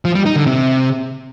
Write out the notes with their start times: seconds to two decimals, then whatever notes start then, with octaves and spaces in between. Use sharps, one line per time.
0.05 F3
0.15 G3
0.26 D#4
0.36 D3
0.46 C3